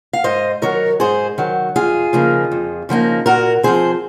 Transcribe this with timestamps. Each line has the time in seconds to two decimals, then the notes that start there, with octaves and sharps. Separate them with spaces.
0.13 F5
0.24 G#2 C5 D#5
0.62 D#3 F#3 A#4 C#5
1.00 G#2 G#4 C5
1.38 D#3 F#3
1.76 F2 F4 G#4
2.13 C#3 F3 A#3 D#4
2.52 F2
2.89 C#3 F3 A#3 D#4
3.26 A#2 F#4 A#4
3.63 F3 C4 G#4 C5